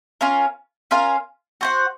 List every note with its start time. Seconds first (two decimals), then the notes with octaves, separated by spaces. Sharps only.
0.21 C#4 F4 A#4 F5
0.91 C#4 F4 A#4 F5
1.61 F#4 C5 F#5